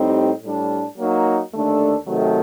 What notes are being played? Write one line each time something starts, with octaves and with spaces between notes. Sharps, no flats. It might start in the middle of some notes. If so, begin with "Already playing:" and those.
Already playing: A2 G3 C4 D#4 G4
A2 G3 D4
F#3 A#3 D#4
D#2 D3 A3 D4 A4
C3 D#3 F#3 A3